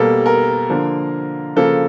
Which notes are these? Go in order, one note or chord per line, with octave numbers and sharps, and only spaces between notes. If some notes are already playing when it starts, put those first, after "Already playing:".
Already playing: B2 G3 A#3 A4
A#4
D3 F3 A#3
C#3 F3 A#3 A4